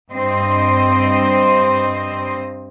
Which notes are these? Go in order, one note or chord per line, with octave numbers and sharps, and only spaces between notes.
G2 C4 C5 D#5